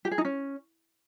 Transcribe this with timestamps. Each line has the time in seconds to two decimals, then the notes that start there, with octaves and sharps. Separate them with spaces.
0.05 G4
0.11 G#4
0.18 D#4
0.25 C#4